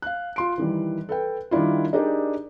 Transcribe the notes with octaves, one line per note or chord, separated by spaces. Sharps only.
F5 F#6
F4 C6 D7
D#3 E3 G3
A4 B4 G5
D#3 G3 D4 E4 F4
D4 D#4 G4 G#4 A#4 D5